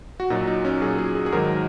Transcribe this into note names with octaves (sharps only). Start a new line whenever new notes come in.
F#4
A#2 F#3 D#4
D#4
C#4
A#2 F#3 G#4
G#4
G#4
G#4
G#2 D#3 F#3 A#4